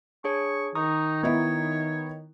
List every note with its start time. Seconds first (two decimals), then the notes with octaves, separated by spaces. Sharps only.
0.24 D4 G#4 C#5 C#6
0.75 D#3 D#4 A#5 C#6 D#6
1.23 B3 D#4 E4 C#5